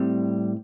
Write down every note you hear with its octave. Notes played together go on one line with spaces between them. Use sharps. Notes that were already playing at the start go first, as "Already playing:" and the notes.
Already playing: A2 G3 C4